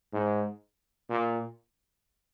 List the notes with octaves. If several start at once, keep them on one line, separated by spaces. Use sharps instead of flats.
G#2
A#2